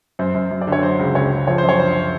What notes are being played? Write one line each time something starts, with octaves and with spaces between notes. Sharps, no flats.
F#2 C5
F#2
F#2
D5
D3
C#5
F#3 C5
C#2
C#2 C#5
C#2
F3 C#5
C5
F#2
C#5
D3 C5